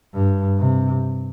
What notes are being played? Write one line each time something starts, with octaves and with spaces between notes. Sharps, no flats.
G2
C3